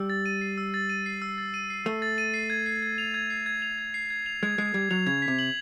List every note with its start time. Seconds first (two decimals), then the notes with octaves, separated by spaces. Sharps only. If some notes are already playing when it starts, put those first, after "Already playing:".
Already playing: G3 E6
0.10 A6
0.26 D#7
0.41 C7
0.58 E6
0.74 A6
0.89 D#7
1.06 C7
1.22 E6
1.38 A6
1.54 D#7
1.70 C7
1.86 A3 E6
2.02 A6
2.18 D#7
2.34 C7
2.50 G#6
2.66 C7
2.82 G#6
2.98 F7
3.14 G#6
3.30 C7
3.46 G#6
3.62 F7
3.78 G#6
3.94 C7
4.10 G#6
4.26 F7
4.43 G#3 G#6
4.58 G#3 C7
4.74 G3 G#6
4.91 F#3 F7
5.06 C#3 G#6
5.22 B6
5.28 C3
5.39 F#7